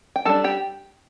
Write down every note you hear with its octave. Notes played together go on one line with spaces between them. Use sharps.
G5
G3 D4 A4 A5
G4 G5